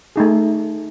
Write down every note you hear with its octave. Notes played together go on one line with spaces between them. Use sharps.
A3 D#4 G#4